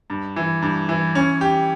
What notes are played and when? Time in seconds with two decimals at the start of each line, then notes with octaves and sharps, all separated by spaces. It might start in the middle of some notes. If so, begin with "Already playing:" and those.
0.10 G2
0.36 E3
0.62 G2
0.89 E3
1.15 C#4
1.41 G4